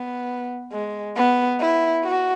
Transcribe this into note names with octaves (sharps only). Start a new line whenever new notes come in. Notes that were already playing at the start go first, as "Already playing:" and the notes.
Already playing: B3
G#3
B3
E4
F#4